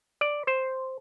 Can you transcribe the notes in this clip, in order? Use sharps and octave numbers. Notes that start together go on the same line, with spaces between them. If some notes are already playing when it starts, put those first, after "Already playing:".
D5
C5